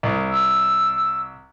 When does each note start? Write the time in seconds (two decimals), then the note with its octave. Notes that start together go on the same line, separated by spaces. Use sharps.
0.03 C2
0.31 E6